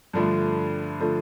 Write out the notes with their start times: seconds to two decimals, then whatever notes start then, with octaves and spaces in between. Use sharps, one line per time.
0.13 G2 D3 F3 A3
1.01 D3 F3 A3